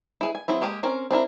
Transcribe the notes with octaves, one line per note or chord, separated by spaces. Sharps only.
E4 G#4 B4
G#5
F#3 C4 E4 G#4
G#3 A#3 G4 C5 D#5
C4 C#4 A#4
C4 D4 E4 A#4